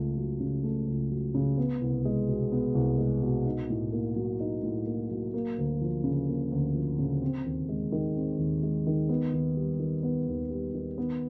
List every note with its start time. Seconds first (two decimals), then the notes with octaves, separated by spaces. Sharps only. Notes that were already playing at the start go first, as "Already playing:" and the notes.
Already playing: C#2 A3
0.17 F#3
0.40 C#3
0.64 A3
0.87 C#2
1.10 F#3
1.35 C#3
1.58 B3
1.81 C2
2.05 G#3
2.28 B2
2.52 B3
2.75 C2
2.98 G#3
3.23 B2
3.45 D#4
3.70 A2
3.92 A#3
4.16 F#3
4.40 D#4
4.63 A2
4.86 A#3
5.10 F#3
5.34 A#3
5.58 D2
5.81 F3
6.04 C#3
6.28 A#3
6.51 D2
6.74 F3
6.99 C#3
7.21 C4
7.46 D#2
7.69 G#3
7.92 D#3
8.16 C4
8.39 D#2
8.63 G#3
8.87 D#3
9.09 B3
9.33 D#2
9.57 G3
9.80 D#3
10.03 B3
10.28 D#2
10.50 G3
10.74 D#3
10.98 B3